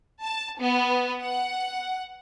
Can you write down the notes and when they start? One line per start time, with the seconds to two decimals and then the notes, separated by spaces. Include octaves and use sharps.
0.21 A5
0.59 B3
1.21 F#5